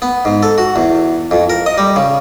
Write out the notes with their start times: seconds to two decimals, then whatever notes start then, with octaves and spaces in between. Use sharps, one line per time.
0.02 B3
0.25 G#2
0.43 A4
0.58 F#4
0.76 E2
1.31 F2
1.50 A#4
1.66 D#5
1.78 G3
1.96 C#3